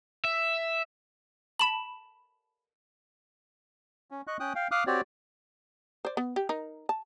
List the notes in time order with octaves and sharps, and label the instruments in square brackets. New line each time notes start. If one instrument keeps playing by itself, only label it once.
[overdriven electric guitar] E5
[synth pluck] A5 B5 [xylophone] E7 F#7
[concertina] C#4
D#5 C#6 F#6
C#4 G5 D#6 F#6
F5 G5
F5 D6 D#6 F6 F#6
C4 F#4 G4 C#5 D5
[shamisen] C5 D5
B3
G4
D#4 A#4
A5